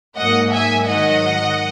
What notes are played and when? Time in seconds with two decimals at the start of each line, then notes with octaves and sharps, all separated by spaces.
0.17 G#2 F#3 A#3 D#5 F#5
0.52 E5 G#5
0.87 G#2 D#3 F#3 D#5 F#5